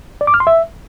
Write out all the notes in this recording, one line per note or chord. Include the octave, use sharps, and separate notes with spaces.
D5
D6
F6
C6
E5